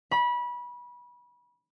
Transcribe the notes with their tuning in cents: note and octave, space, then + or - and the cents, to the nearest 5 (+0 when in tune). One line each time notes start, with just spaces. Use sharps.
B5 -25